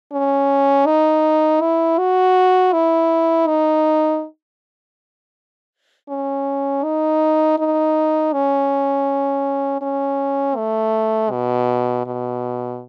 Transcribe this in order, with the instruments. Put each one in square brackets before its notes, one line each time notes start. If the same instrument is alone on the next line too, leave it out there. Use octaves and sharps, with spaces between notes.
[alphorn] C#4
D#4
E4
F#4
E4
D#4
C#4
D#4
D#4
C#4
C#4
A3
B2
B2